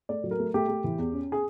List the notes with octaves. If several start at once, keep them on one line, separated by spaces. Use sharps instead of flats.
A3 D5
F#3
A#4
A3
A3 G4
A3
E3
E2
C#4
G#4